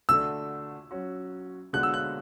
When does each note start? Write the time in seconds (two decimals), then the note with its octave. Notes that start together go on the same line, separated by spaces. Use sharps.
0.09 D3 A3 D4 F#4 E6
0.91 F#3 C#4 F#4
1.73 D3 G#3 B3 F#4 F#6
1.83 E6
1.94 F#6